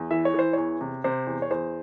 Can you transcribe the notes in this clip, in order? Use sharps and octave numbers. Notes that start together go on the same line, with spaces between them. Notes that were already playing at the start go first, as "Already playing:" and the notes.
Already playing: E2
E3 E5
C#5
E3 C5
E2 C#5
C3
C3 C5
E2
C#5
E2 C5